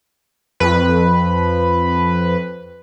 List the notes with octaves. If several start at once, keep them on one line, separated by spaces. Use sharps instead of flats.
F2 B4